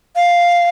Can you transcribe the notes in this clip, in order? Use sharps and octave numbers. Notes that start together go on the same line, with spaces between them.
F5